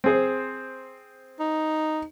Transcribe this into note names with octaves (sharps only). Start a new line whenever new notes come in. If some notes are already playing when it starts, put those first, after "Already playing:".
C4 G#4 C5
D#4